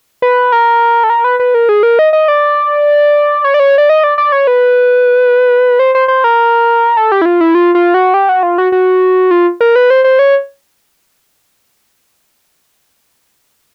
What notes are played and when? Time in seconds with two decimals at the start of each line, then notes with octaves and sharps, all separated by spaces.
0.22 B4
0.52 A#4
1.04 A4
1.10 A#4
1.24 B4
1.40 B4
1.54 A#4
1.69 G#4
1.83 A#4
1.99 D#5
2.13 D#5
2.28 D5
3.44 C#5
3.54 D5
3.60 C#5
3.78 D5
3.89 D#5
4.04 D5
4.18 D5
4.32 C#5
4.47 B4
5.79 C5
5.95 C5
6.08 C5
6.24 A#4
6.97 A4
7.12 G4
7.22 E4
7.25 F4
7.41 E4
7.55 F4
7.75 F4
7.94 F#4
8.14 G4
8.29 F#4
8.43 F4
8.58 F#4
8.72 F#4
9.31 F4
9.61 A#4
9.76 B4
9.90 C5
10.04 C5
10.19 C#5